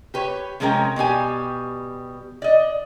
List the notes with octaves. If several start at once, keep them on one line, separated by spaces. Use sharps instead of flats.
G4 B4 C#5
C3 F3 G#3 C#4 A#4 G5
B2 G3 G4 G#5
D5 D#5